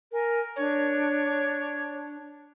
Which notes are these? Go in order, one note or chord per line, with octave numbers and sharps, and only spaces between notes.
A#4 G#5
D4 C#5